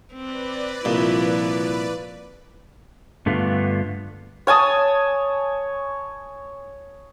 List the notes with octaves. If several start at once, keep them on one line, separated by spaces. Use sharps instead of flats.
C4 B4 D5
C2 A#2 F3 E4
G2 D3 A3 B3 F4
C#5 G#5 A5 D#6